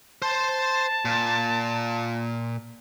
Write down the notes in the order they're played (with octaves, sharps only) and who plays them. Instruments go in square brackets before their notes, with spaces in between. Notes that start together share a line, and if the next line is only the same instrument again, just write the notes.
[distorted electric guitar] C5 C6 [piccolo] A5
[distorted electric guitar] A#2